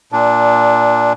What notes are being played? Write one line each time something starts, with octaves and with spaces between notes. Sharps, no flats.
A#2 D4